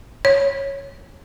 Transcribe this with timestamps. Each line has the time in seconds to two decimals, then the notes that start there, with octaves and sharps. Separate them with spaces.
0.25 C#5